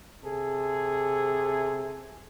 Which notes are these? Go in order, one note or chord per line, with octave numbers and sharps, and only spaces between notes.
C3 G#4 A4